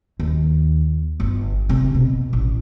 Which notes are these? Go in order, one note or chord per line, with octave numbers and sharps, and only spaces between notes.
D#2
G1
C3
B2
A1